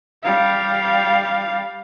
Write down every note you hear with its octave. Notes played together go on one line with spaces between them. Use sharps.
G3 F5